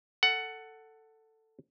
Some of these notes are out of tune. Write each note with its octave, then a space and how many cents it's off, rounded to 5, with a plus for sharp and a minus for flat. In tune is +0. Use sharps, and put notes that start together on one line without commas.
A4 +10 F#5 +10